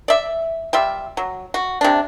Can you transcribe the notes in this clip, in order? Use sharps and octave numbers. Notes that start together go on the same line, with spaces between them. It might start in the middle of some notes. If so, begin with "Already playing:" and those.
D5 E5
G3 F4 E5
F#3
F#4
C3 D4